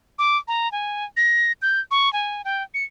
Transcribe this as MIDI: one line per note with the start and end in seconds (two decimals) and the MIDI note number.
0.19 0.38 86
0.48 0.71 82
0.72 1.05 80
1.17 1.52 94
1.62 1.80 91
1.91 2.11 85
2.13 2.42 80
2.45 2.63 79
2.74 2.84 97